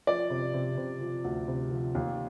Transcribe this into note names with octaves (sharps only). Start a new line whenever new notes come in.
F3 D5
C3
C3
C3
F3
D2
C3
F3
D#2